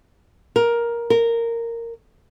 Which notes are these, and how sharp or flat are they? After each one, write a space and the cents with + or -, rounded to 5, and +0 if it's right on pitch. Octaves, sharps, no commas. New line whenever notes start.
A#4 +10
A#4 -10